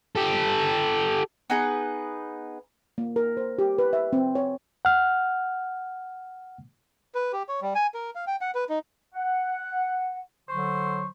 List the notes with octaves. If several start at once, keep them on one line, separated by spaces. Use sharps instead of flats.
G4 A4
B3 D#4 G#4 B4
A#3
A#4
C5
G4
B4
E5
C4
C#5
F#5 F6
B4
G4
C#5
G3
G#5
A#4
F5
G5
F#5
B4
D#4
F#5
D3 F#3 C5 C#6